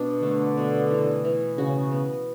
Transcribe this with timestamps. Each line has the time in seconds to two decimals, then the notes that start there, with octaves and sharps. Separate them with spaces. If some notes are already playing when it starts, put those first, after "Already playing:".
Already playing: B2 D4
0.23 D3 A3
0.57 B2
0.91 E3
1.25 E3
1.58 C#3 F#4
1.91 B3